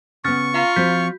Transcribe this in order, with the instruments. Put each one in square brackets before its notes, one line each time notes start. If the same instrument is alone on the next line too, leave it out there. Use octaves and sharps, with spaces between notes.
[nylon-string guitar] C#3 B3 [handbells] C#4 F6 A6 [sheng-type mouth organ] C#6
[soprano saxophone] F4 [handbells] F5 A#5
[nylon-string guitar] F3 C4 C5 [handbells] F#4 G6 B6